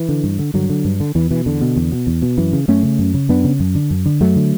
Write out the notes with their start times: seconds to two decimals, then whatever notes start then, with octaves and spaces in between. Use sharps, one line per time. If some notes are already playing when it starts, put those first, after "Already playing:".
Already playing: E3
0.09 D3
0.24 G2
0.39 D3
0.54 G2 D3 F#3
0.70 D3
0.85 G2
1.00 D3
1.15 E2 E3
1.31 B2 E3
1.46 E2 D3
1.61 B2
1.76 E2
1.92 B2
2.07 E2
2.22 B2
2.38 F#2 E3
2.53 C#3
2.68 F#2 A3 C#4
2.83 C#3
2.99 F#2
3.14 C#3
3.29 F#2 B3 D4
3.44 C#3
3.60 F#2
3.75 D3
3.91 F#2
4.06 D3
4.20 F#2 F#3 A3
4.36 D3